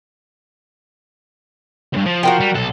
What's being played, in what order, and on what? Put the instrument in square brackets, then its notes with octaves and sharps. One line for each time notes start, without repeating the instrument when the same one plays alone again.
[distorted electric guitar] C#2 G2
F3
[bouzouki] F#4 A#4 G5
[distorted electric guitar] G3
B1 A4